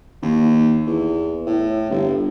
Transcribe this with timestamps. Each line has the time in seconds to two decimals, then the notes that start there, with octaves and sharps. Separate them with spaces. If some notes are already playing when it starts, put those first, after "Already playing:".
0.22 D#2
0.86 E2
1.46 A2
1.90 G1